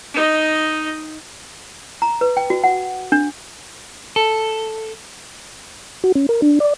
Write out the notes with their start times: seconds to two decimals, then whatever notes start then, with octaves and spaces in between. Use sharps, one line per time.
0.14 D#4 D#5
2.02 A#5
2.21 B4
2.37 G5
2.50 F#4
2.64 F#5
3.12 D4
4.16 A4
6.04 F#4
6.15 C#4
6.29 A#4
6.42 D4
6.60 D5